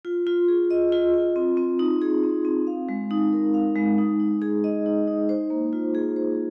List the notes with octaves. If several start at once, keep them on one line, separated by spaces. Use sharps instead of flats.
F4
F4
G#4
D#5
F4
F4
C4
C4
D#4
G#4
C4
C4
F5
G#3
D#4
A#4
F5
G#3
D#4
D#4
G#4
D#5
D#4
D#4
C5
A#3
F4
G#4
C5